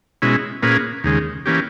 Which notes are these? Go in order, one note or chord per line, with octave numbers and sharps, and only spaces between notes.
B2 G#3 C#4 E4
A#2 A#3 C#4 G#4 B4
D#2 C#3 G#3
E3 A#3 C#4 G4